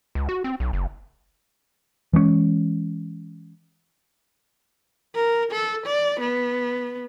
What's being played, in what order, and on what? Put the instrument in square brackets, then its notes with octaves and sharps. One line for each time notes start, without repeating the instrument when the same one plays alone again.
[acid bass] C#2
F#4
C4
B1
F#1
[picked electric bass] E3 G#3 A3 C#4
[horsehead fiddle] A#4
A4
D5
B3